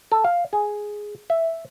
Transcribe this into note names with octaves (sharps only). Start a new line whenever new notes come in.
A4
F5
G#4
E5